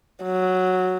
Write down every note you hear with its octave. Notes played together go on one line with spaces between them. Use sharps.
F#3